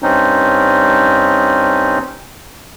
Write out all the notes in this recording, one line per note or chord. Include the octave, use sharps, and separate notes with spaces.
G2 C4 C#4 D#4